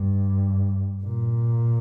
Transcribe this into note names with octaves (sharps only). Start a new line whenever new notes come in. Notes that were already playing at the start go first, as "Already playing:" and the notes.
Already playing: G2
A#2